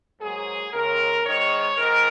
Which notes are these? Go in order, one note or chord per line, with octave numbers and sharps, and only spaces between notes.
G#2 F#3 A#3 G#4
D#2 C#3 G#3 A#4
G#2 D#3 G#3 C#5
G#2 D#3 A#4